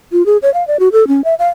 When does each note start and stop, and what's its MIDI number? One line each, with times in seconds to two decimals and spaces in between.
0.12 0.25 65
0.26 0.37 68
0.42 0.52 73
0.54 0.66 77
0.68 0.77 74
0.80 0.89 66
0.92 1.07 69
1.08 1.23 61
1.24 1.34 76
1.39 1.48 77